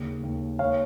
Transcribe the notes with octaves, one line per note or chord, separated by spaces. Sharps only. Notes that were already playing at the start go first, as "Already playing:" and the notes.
Already playing: D#2 C#3
D#2
D#2 C#5 F5